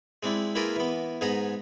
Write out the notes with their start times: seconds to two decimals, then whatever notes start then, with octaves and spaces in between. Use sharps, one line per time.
0.23 G#3 C4 D4 E4
0.55 A#3 E4 F4 G#4 A#4 B4
0.76 E3 B3
1.21 G#2 B3 G#4 B4 A#5